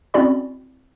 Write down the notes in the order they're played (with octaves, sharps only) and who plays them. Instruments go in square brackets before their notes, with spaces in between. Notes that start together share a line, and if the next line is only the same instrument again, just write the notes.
[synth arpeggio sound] C4 C#4 E4 F#4 D5 B5